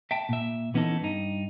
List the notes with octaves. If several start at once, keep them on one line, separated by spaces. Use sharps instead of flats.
E5 G5 A5
A#2 E5
E3 B3 C#4 D#4 A4
G2 D#4